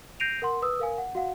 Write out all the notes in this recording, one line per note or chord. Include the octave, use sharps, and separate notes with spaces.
G6 A#6 C7 D7 D#7 F7
A#4 F#5 C6
B4 D#6 E6
A#4 F5 G#5
F#5
F#4 F5 F#5